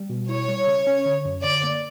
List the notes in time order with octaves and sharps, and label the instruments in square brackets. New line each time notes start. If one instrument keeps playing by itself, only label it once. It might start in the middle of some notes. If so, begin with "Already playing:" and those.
Already playing: [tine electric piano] G3
B2
[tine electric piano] E4 [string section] C#5
[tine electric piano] G3
C#3
C#4
D3
F#2
[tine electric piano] D3 [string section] D5
[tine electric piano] A#3